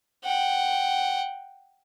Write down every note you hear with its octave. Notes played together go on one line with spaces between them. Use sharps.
F#5 G5